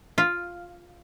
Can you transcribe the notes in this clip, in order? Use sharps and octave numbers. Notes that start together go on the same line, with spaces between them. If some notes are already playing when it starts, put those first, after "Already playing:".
F4